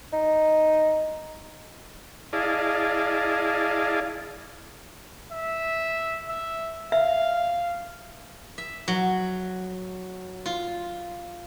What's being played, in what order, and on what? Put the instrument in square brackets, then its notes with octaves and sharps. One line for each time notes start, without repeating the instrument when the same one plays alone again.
[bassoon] D#4
[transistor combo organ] E4 G#4 D5 D#5 F5 A5
[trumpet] E5
E5
[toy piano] E5 [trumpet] F5
[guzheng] E5
F#3
F4